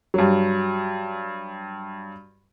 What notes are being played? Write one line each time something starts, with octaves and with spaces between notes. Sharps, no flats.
G2 F#3